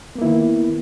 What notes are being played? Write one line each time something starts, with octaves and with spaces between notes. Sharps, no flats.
D#3 A#3 B3 E4